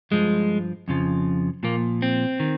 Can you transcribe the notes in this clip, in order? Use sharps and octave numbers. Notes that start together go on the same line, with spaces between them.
G2 F3 G#3
F2 C#3 F3
A#2 F3 A#3
C4
D#3